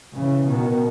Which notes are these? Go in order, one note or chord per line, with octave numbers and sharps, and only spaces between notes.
C#3 E3
B2 D#3